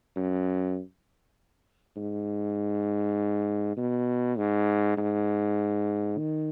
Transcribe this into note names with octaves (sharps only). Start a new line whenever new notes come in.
F#2
G#2
B2
G#2
G#2
D#3